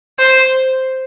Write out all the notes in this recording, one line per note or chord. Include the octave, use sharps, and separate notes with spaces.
C5